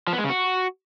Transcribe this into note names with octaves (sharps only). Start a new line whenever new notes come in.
F3
B3
G#3
C#3
F#4